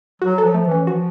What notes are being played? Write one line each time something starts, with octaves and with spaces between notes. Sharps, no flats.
F#3 F#4
A4
F3
A3
E3
C#4
F3 F#4